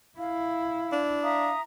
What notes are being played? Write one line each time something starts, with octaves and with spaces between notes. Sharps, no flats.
E4 F5
D4
E5 F5 A#5 D#6